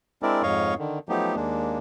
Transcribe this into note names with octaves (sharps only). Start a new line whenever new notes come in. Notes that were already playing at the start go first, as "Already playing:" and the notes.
G#3 C4 D4 E4 A#4 D5
F2 G#2 C#5 D#5 F5 C#6
D3 D#3
F3 F#3 A3 B3 D#4 G4
D#2 G#3 A#3 D4